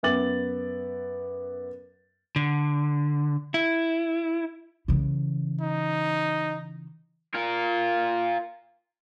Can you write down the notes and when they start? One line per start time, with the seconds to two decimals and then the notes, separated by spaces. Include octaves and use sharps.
0.03 F#2 B3 E5 D6 A6 F#7
2.36 D3
3.54 E4
4.88 C#3 E3
5.61 D#4
7.34 F4 A#4